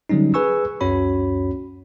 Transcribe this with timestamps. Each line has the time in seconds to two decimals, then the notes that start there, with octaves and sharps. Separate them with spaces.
0.09 D3 F#3 G3 C#4 D#4
0.34 G#4 B4 G#5 C#6 E6
0.81 C#2 F#2 C#4 F#4 C#5 B5